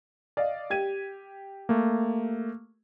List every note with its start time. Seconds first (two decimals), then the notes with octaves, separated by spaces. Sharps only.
0.37 D5 D#5 F5
0.70 G4 G#6 D#7
1.69 A3 A#3